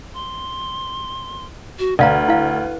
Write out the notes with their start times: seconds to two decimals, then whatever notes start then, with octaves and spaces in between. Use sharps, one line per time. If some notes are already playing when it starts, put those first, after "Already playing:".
0.14 C6
1.79 F#4
1.99 D2 B4 D5 F5 A#5
2.28 E4 F5